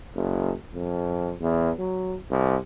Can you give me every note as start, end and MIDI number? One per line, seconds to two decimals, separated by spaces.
0.15 0.52 30
0.74 1.33 41
1.41 1.70 40
1.79 2.16 54
2.30 2.56 36